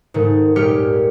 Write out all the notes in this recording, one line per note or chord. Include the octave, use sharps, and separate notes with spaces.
G#2 D#3 A3
D#1 G#3 G4 F6 C#7